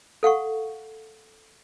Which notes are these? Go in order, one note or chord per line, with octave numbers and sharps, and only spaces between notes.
A4 F5 F#5 C#6